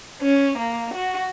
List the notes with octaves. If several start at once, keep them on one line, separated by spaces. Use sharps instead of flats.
C#4
A#3
F#4